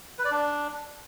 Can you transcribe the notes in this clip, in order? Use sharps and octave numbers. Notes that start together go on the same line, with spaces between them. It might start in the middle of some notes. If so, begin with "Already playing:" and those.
B4
D5
D4